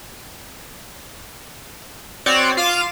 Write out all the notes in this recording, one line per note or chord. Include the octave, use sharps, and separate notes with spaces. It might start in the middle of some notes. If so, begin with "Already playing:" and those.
C4 F#4 C#5 D5 C7
F4 F5 D6 D#7 E7